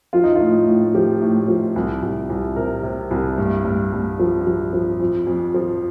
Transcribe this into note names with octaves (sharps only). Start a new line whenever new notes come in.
F3 F4
D#4
A2 F4
A2
F3 G4
A2
F3
C2
C2
C2
C3 A#4
C3
C2
G2
G2
G2
F3
F3
F3
F2
F2
F3